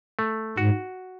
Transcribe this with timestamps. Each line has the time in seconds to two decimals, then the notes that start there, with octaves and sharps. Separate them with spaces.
0.19 A3
0.57 G#2 F#4